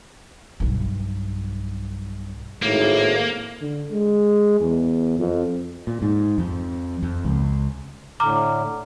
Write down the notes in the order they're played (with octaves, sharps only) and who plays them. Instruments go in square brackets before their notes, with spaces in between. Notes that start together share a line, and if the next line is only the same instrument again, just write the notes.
[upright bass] B1 G2
[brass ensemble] G#1 [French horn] A2 [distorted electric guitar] A#3
[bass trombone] D3
G#3
E2
F2
[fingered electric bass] A#2
G#2
F2
F2
C#2
[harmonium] A2 D3 [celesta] A#5 D6 F6